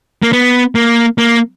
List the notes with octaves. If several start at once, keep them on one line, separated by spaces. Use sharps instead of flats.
A#3
B3
A#3
A#3